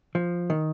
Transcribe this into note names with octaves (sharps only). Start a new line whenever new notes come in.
F3
D#3